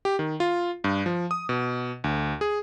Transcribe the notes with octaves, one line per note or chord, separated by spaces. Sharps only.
G4
D#3
F4
G2
F3
D#6
B2
D2
G#4